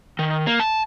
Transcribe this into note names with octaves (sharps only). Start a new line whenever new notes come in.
D#3
A#3
A5